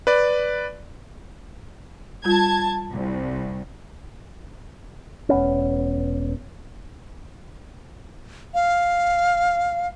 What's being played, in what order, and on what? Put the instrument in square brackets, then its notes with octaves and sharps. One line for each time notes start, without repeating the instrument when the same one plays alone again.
[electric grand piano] B4 D5
[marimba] G3 F4 [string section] A5 G#6
[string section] C2
[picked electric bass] E1 B3 C#4
[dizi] F5